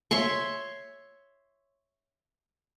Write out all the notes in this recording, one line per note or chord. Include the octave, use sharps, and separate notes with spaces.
C#5 E5 C6 C#6